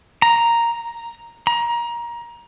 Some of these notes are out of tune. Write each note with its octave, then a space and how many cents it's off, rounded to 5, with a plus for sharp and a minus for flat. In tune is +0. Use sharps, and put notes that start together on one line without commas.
A#5 +0
A#5 +20